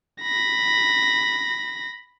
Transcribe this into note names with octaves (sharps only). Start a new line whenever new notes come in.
B5 A#6